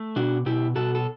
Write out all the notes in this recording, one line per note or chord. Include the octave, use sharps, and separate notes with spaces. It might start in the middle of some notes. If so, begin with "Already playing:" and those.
Already playing: A3
B2 D4 F#4
B2 E4 G4
B2 F#4 A4
A4